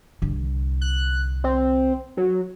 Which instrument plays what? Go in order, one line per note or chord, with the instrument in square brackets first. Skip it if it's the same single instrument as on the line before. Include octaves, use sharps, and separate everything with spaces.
[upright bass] C2 D3
[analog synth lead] F#6
C4
F#3